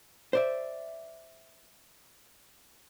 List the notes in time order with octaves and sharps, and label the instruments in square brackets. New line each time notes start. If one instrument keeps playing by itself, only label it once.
[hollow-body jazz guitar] C5 D5 E5